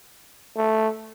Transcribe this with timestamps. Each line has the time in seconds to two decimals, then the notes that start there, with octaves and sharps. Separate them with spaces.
0.57 A3